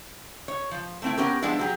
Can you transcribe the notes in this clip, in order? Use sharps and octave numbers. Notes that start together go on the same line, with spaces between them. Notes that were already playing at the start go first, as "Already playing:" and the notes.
C#5
F3
A3 C4 E4
B3 C#4 G4 A#4
F3 G#3 B3 D4 E4
F#3 G4 G#4